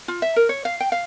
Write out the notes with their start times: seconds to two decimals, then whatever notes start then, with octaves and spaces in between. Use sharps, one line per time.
0.08 F4
0.22 E5
0.36 A#4
0.49 C#5
0.65 F5
0.80 G5
0.92 F5